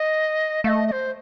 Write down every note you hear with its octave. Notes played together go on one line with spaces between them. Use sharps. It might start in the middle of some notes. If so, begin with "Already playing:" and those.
Already playing: D#5
A3 D#5 F5
D#5
C5